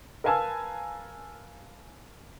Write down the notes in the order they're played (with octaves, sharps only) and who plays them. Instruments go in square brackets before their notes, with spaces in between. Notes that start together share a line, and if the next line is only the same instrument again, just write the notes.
[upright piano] A#4 B4 F5 G#5 A5 E6